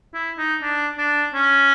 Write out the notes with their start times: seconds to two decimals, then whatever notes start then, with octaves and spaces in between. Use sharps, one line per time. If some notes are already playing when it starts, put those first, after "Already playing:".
0.14 E4
0.38 D#4
0.62 D4
0.98 D4
1.34 C#4